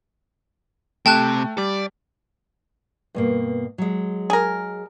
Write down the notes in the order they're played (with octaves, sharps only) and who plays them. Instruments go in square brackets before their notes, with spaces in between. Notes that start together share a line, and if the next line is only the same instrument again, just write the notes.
[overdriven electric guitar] C3 [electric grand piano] A3 [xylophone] G5 A5 F#6
[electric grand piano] G3 [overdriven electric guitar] D5
[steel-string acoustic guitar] G2 B2 A#3
F#3 G#3
[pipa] G#4 A#4